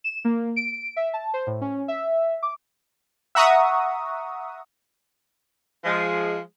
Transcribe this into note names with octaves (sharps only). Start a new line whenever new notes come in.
E7
A#3
D7
E5
A5
C5
A2
C#4
E5
D6
E5 F#5 A#5 C#6 D#6
F3 G#3